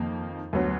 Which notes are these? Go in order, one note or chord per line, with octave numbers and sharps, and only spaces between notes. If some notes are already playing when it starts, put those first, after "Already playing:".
Already playing: F2 D#3 A#3
D2 D3 F#3 B3